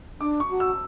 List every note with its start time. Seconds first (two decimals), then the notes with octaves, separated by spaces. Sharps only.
0.20 D4 D6
0.40 C#6
0.50 F#4
0.60 E6